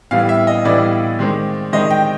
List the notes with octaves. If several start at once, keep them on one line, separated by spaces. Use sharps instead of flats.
A2 E3 G3 B3 F5
E5
D#5
A2 E3 G3 B3 D5
D#3 G#3 C4
D#3 G#3 C4 D#5
G5